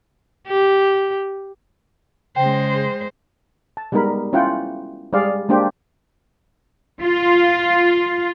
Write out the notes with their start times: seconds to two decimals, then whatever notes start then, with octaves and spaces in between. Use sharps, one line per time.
0.48 G4
2.36 C#3 G#3 C5 G5
3.77 A5
3.92 G3 G#3 B3 D#4 A#4 B5
4.33 C#4 E4 F4 F#5 G5
5.13 G3 G#3 G#4 D5 F5
5.49 G#3 A#3 D4 G4 C5 G5
7.02 F4